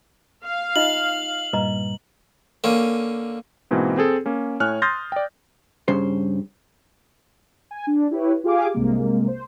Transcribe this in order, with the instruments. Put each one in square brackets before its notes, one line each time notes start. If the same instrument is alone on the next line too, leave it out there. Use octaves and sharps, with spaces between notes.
[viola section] F5
[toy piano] D#4 F4 D#5 [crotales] F#7
[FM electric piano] G2 A#2 G3 [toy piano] B4 D#5 A#5
[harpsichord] D3 A#3 C#4
[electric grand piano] G#2 B2 E3 A#3 C4
C4 G#4 A4
A#3 C#4
A2 C#5 G#5 F6 F#6
C6 D#6 F6 G6 A6 A#6
D5 G5
[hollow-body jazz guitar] G2 C#3 C5
[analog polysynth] G#5
D4
E4 G4 B4 C#5
F4 G4 G#4 F5 G#5 D6
C2 G2 C3 G#3 A#3
C5